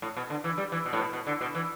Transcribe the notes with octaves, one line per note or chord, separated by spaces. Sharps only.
A2
B2
D3
E3
G3
E3
B2
A2
B2
B2
D3
B2
E3